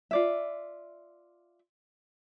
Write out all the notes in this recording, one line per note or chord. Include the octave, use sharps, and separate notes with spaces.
F4 D5 E5